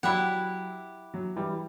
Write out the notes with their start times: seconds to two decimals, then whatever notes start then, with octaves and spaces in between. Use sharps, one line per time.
0.03 F#3 E4 G4 D5 F#5
1.14 F#3
1.36 E3 G3